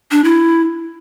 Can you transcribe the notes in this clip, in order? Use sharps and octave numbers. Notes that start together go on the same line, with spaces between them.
D4
E4